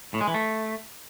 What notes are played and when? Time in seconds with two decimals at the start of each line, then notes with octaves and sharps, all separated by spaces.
0.14 A2
0.21 G#3
0.28 E3
0.34 A3